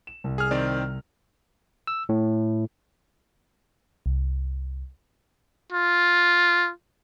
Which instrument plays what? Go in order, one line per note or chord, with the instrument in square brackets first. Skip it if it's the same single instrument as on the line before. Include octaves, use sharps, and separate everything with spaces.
[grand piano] E7
C2
[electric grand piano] G#4 F6
D#3 C4 D5
[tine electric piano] E6
A2
[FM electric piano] C2
[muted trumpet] F4